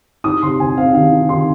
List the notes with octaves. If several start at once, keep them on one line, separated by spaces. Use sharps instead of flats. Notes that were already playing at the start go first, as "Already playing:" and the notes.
D#4 D#6
C3 C6
C3 G#5
C4 F5
D#3 F5
D#4
D#3 C6